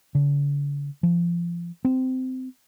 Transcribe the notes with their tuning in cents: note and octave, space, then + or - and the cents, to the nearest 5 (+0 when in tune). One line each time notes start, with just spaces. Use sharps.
D3 -45
F3 -25
C4 -20